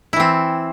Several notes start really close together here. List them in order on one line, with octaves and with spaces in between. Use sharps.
E4 E3 C4